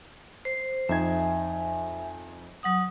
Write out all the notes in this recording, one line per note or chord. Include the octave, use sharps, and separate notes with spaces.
C5
F2 D#4 E5 G#5 G#6
F#3 F#5 D#6